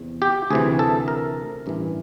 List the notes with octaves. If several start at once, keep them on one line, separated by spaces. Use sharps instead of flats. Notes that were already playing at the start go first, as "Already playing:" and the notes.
Already playing: E2 C3
G4
D2 C3 E3 G#4
A4
A#4
A1 G2 E3